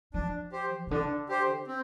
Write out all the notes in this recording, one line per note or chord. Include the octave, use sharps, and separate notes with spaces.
F3 D4
G4 C5
C3
D3 D4
G4 C5
C4